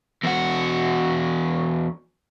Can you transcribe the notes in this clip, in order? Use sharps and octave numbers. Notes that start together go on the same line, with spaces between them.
E2 F#4